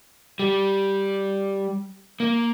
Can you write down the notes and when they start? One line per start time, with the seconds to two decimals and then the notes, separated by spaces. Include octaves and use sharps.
0.39 G3
2.20 A#3